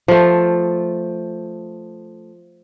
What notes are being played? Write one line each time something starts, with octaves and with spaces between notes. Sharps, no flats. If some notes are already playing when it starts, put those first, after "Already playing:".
F3 A3